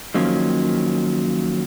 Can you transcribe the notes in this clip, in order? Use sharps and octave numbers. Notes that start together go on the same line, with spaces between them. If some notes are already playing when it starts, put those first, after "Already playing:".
D#3 F3 F#3 A#3 C#4